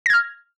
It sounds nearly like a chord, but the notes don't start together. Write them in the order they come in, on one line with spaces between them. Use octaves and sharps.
A#6 G#6 F6